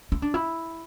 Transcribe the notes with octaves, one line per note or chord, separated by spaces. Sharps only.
E4
D4
E4